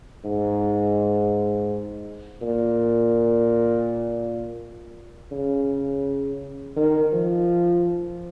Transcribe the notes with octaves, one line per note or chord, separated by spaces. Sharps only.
G#2
A#2
C#3
D#3
F3